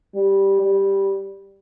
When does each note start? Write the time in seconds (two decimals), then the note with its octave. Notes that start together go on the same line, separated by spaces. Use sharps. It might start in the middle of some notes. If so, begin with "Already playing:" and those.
0.15 G3
0.62 G3